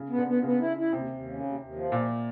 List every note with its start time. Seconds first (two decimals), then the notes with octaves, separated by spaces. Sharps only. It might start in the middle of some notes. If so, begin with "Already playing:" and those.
Already playing: C#3
0.10 B3
0.18 D3
0.27 B3
0.43 C#3 B3
0.60 E4
0.77 E4
0.93 D#2 C3
1.10 D#2
1.25 C#3
1.43 D#2
1.59 D#2
1.75 F3
1.92 D#2 A#2